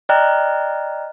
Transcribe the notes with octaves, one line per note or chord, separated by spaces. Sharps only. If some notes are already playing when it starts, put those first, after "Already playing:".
D5 D#5 G5 A#5 F6 F#6